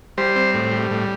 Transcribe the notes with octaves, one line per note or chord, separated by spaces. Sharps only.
G3 C5
C4
A2
G3
A2